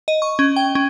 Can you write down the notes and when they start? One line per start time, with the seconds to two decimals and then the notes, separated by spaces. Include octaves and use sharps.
0.08 D#5
0.22 C#6
0.39 C#4
0.56 G5
0.75 C#4